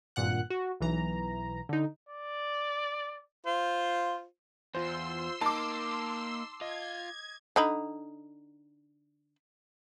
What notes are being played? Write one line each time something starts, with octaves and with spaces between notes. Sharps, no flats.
G#1 G2 A#2 F#5 F#6
F#4
B1 E3 A#5
D3 D#4
D5
F4 C5
E2 F4 C5 C6 E6
A#3 D#4 A5 D6
F4 D#5 G#6
D3 D#4 B5